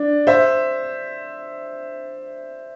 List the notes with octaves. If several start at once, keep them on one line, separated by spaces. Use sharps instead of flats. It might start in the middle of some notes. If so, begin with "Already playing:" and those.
Already playing: D4
C5 E5